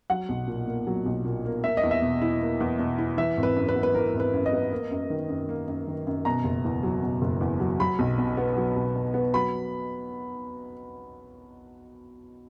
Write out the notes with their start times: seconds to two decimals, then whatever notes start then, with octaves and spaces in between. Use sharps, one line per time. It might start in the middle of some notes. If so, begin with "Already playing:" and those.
0.10 F#3 F#5
0.29 B1
0.47 A#2
0.67 A#3
0.87 F#3
1.06 B1
1.24 A#2
1.45 A#3
1.64 A#3 E5
1.77 D#5
1.83 E2
1.91 E5
2.02 B2
2.22 E4
2.41 A#3
2.60 E2
2.79 B2
2.98 E4
3.17 E3 E5
3.37 G#1
3.43 B4
3.56 F#2
3.69 B4
3.76 B3
3.83 B4
3.94 E3 A#4
4.14 G#1
4.20 B4
4.33 F#2
4.46 D#5
4.53 B3
4.72 A#3
4.91 F#2
5.10 D#3
5.29 F#2
5.49 A#3
5.68 F#2
5.87 D#3
6.07 F#2
6.25 B2 A#5
6.44 F#1
6.64 E2
6.83 F#3
7.03 B2
7.22 F#1
7.41 E2
7.60 F#3
7.80 F#3 B5
7.99 B1
8.18 B2
8.37 B3
8.56 F#3
8.76 B1
8.96 B2
9.14 B3
9.33 F#3 B5